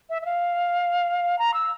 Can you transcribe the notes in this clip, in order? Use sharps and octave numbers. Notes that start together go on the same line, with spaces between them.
E5
E5
F5
A#5
E6